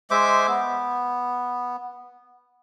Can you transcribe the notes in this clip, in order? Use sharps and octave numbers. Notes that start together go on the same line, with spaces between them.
G#3 C5 E5 D6
B3